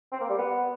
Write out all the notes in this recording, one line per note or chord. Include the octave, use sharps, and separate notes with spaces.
C4
A#3
G3
B3